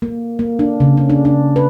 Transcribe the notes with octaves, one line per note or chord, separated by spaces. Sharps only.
A#3
A#3
D4
C#3
C#4
D4
D4
B4